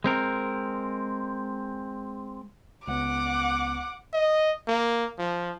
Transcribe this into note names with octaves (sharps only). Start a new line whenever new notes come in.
G#3 C4 A#4
C#2 B3 F#5 D6
D#5
A#3
F3